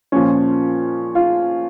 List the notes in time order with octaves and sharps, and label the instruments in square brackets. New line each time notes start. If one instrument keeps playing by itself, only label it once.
[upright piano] A#2 F3 C#4
F4